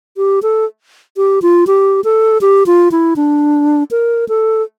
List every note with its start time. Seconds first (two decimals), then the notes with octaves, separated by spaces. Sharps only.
0.17 G4
0.43 A4
1.17 G4
1.42 F4
1.67 G4
2.04 A4
2.41 G4
2.66 F4
2.92 E4
3.16 D4
3.91 A#4
4.29 A4